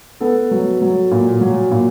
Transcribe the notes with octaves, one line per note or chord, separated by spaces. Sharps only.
B3 A4
F#3
F#3
A#2
F#3
A#2